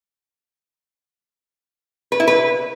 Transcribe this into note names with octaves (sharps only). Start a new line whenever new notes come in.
B4
E4
B4